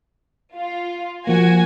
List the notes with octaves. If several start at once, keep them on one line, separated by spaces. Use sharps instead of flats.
F4
F3 A#3 F#4 G#5